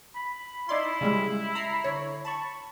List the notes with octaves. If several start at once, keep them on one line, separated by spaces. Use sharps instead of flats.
B5
D#4 E4 D5 C6
C#3 G3 G#3
A#5 B5 C7
D3 C#5
A5 B5 C#6